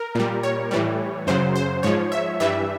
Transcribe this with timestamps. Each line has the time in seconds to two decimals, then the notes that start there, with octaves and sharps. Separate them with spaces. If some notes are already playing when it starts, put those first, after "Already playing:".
Already playing: A#4
0.15 A#2 G3
0.43 C#5
0.71 A2 E3 G3
1.27 F#2 C#3 F#3 C5
1.56 C5
1.83 G#2 F3 C#5
2.12 E5
2.40 G2 E3 G3 E5